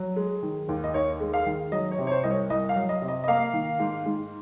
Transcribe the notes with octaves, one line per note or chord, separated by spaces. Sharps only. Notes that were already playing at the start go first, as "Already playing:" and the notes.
Already playing: F#3
G#3
D#3
D#2
D#5
D#2 C#5
G#3
F5
D#3
F#3 D#5
C#5
C3
C#5
C5
C2 D#5
C#5
C2 D#5
F5
F#3
D#5
C3
D#5
D#5
A#3 F5
D#3
G#2
G#2